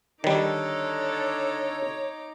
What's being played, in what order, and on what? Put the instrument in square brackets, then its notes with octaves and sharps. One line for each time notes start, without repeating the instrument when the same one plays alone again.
[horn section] D3 A4 [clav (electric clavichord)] D#3 G3 [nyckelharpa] D#4 D6 [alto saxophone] C#5